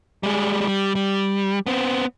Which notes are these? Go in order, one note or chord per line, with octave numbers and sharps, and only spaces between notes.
G3 G#3
G3
G3
B3 C4